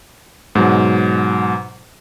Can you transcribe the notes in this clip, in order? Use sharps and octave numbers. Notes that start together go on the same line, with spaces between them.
G#2 B2 F#3